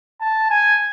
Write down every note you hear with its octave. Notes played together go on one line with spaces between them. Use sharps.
A5
G#5